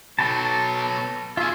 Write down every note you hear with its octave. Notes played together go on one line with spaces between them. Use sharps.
B2 F#3 A4 G5 A5
F4 G#4 E5 G#5